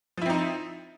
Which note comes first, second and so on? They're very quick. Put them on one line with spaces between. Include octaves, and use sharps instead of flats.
F3 E4 C4 D#4